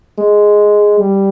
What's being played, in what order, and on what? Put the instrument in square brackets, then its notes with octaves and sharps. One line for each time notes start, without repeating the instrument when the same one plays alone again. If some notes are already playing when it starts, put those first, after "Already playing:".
[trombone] G#3
G3